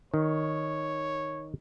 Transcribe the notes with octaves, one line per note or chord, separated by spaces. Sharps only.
D#3 C#5